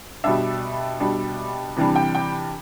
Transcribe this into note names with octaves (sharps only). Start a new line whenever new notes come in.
B2 G3 D4 E5
B2 G3 D4
C3 E3 G3 D4
G5
G5